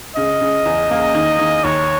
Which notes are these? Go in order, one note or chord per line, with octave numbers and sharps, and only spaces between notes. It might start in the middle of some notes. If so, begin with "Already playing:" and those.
C#3 D#5
C#3
E2
A#3
D#3
D#3
D#2 C#5